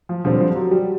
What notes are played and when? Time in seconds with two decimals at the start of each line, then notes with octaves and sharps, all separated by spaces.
0.09 F3
0.25 D3 F3 G3 C4
0.40 F3
0.56 F#3
0.71 G3